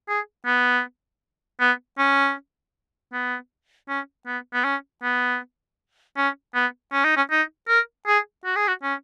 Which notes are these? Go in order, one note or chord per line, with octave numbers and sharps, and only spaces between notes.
G#4
B3
B3
C#4
B3
C#4
B3
B3
C#4
B3
C#4
B3
C#4
D#4
C#4
D#4
A#4
G#4
F#4
G#4
F#4
C#4